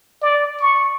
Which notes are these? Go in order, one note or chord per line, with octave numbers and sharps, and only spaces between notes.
D5
C#6